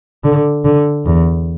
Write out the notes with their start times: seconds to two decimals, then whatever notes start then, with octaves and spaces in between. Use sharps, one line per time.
0.24 D3
0.65 D3
1.06 E2